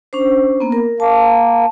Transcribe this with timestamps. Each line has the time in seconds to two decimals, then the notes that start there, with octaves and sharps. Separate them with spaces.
0.13 C#4 D4 C5
0.60 A#3 B3
0.72 A#4
1.00 A#3 A5